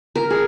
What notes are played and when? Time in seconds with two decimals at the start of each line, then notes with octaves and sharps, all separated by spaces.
0.15 A#4
0.30 G#4